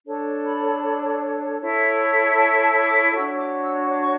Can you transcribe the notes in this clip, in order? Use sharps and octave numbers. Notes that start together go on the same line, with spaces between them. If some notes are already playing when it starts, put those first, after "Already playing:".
D4 A4 C#5
B5
E4 A4 C#5
A5
A5
E6
D6
D4 F#4 C#5 E6
D6
E6
D6
C#6